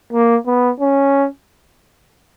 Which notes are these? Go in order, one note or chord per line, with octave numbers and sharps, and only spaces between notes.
A#3
B3
C#4